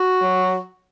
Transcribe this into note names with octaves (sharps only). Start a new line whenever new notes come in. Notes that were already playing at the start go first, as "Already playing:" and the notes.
Already playing: F#4
F#3